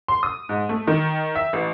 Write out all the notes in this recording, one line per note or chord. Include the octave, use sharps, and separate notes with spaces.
C6
D#6
G#2
A3
D#3
E5
A1